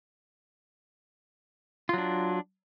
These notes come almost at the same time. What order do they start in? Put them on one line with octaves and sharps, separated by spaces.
F4 F#3 D4